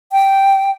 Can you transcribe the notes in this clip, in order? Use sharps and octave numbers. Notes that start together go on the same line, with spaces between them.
G5